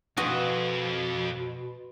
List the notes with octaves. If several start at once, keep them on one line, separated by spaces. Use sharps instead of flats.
F2 B2 F#4 B4 D#5 C6 E6